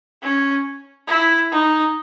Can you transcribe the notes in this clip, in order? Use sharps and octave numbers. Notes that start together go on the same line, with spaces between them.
C#4
E4
D#4